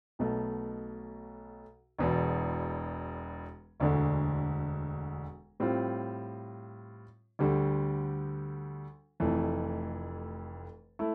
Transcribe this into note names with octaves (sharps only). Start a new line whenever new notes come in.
B1 B2 A3
E1 E2 B2
E1 D2 D3
A2 G3 C4 F4
D2 D3 G3
F1 F2 E3 A3
A3 E4